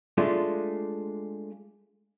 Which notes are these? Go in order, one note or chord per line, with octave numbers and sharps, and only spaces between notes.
G#3 A3 D4 F4